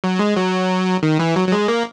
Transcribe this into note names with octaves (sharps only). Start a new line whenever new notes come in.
F#3
G#3
F#3
D#3
E3
F#3
F#3
G#3
A#3